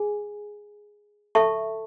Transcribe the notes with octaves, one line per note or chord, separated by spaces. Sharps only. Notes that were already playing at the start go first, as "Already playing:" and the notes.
Already playing: G#4 G#5
A4 E5 A5 C#6